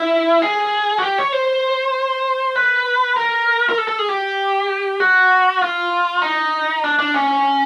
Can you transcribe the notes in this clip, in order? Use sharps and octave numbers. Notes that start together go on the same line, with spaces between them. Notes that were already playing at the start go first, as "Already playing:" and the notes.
Already playing: E4
G#4
F#4
G4
C#5
C5
B4
A#4
A#4
A4
A4
G#4
G4
F#4
F4
D#4
D4
D4
C#4